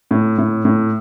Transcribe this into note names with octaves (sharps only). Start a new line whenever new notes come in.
A2
A2
A2